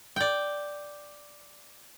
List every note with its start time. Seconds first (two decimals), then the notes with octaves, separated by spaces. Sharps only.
0.16 D5 G5